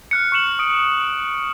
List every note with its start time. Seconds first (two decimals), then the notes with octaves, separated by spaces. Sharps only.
0.11 F6 F#6 C#7
0.32 C#6 F6 C#7 E7 F#7
0.59 D#6 D7